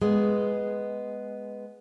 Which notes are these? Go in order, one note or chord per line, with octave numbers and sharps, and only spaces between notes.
G#3 B3